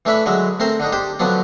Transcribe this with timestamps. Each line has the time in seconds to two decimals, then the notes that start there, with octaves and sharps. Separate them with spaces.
0.05 E3 A3 D4 E4 C#5 B5
0.26 D3 F#3 G#3 E4
0.60 A3 C4 A#4 C5
0.80 D3 D4 D#4
0.93 D4 G4 C5
1.19 D3 F3 F#3 B3 D4